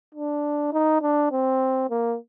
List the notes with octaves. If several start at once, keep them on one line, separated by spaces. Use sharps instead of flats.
D4
D#4
D4
C4
A#3